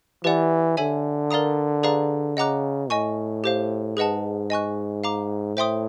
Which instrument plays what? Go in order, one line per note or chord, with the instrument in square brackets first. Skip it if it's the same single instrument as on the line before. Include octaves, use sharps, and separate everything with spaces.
[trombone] E3 [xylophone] G4 B4 D5 F#5
[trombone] D3 [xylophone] A4 C#5 E5 G#5
[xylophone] A#4 D5 F5 A#5 D#6
G#4 B4 D5 F5 A#5
[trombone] C#3 [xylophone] D#5 F#5 A#5 D6 F#6
[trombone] A2 [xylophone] D#5 G#5 C#6
[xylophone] G4 C5 F5
[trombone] G#2 [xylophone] G#4 B4 D#5 F#5 A5
[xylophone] D#5 G#5 C#6 F#6
F5 A#5 D6
[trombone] A2 [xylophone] C5 E5 G5 C6 D#6